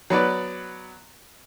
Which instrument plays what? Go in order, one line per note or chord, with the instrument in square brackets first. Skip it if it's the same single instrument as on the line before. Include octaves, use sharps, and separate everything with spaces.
[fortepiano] F#3 B3 B4 D5